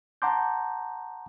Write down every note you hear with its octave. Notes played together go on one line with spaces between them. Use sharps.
F#5 A5 A#5 C6 D6 G6